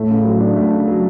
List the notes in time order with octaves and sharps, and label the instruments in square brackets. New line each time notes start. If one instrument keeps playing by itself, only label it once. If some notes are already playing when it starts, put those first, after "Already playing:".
Already playing: [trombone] A2 [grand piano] A3
[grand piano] C#3
F#3
D4
A3
C#3
F#3